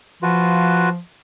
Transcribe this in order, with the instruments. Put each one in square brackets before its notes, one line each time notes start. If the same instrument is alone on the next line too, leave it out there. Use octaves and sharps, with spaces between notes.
[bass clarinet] F3 [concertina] F4 F#4 B4